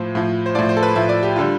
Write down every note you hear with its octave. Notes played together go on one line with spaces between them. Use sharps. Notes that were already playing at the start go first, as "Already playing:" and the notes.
Already playing: A2 F3 C5
A2 F3
C5
A2 F3 D5
C5
A4
B4
A2 F3 E5
D5
G4
D3 G3 F4